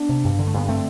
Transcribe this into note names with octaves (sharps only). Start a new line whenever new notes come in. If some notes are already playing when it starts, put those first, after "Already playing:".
Already playing: B3 D4
C3
G2
D3
A3
G2 B3
D3 A3 C4